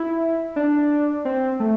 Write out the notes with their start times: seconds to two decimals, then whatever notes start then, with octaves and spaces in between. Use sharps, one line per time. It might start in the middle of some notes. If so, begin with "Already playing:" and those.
Already playing: E4
0.56 D4
1.25 C4
1.60 A3